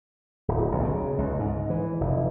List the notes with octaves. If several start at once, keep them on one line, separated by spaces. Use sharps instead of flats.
D1
B1
C#3
C#2
G#2
E3
F1